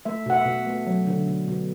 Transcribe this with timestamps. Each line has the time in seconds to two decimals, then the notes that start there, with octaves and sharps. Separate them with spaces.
0.05 A3 E5
0.26 B2 F#5
0.36 E5
0.46 B2
0.66 A3
0.87 F#3
1.07 D3
1.28 B2
1.48 B2